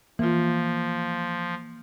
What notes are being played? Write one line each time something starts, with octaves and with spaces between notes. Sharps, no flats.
E3 F3 A#3 F4